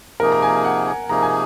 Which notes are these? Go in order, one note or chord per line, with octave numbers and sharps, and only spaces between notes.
C3 F3 A#3 D#4 G#4 A#4
A#5
G#5
F#5
G#5
C3 F3 A#3 D#4 G#4 A#5
G#5